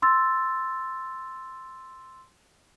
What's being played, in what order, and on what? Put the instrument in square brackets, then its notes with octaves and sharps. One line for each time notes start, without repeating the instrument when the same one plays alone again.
[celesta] C6 E6 A6